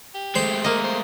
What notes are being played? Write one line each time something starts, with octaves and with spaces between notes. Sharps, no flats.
G4
G#3 A3 C5
A#3 D#5
C5